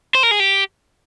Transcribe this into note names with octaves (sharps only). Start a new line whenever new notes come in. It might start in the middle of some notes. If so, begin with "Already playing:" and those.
C5
A#4
G#4
G4